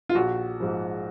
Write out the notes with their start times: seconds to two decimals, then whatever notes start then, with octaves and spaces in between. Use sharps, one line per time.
0.09 F4
0.15 A#1 F#4
0.60 G#2 F3